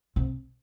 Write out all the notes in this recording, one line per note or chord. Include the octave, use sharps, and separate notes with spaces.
C3